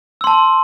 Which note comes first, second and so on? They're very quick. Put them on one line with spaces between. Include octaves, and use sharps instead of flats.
E6 C6 A5